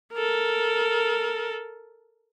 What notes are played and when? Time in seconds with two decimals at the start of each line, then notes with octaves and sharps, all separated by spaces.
0.13 A4 A#4